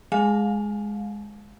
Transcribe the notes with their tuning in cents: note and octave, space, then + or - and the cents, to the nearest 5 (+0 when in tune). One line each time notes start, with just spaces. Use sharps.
G#3 +0 F5 +25 A5 -30